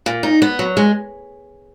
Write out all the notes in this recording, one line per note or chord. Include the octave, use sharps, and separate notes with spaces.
A#2
D#4
B3
F#3
G#3